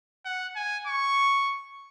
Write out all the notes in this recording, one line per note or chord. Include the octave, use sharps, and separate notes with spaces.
F#5
G#5
C#6